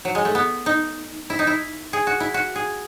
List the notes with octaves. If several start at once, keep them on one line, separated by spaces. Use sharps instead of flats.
F#3
G#3
A3
B3
D#4
E4
D#4
E4
G#4
F#4
E4
F#4
G#4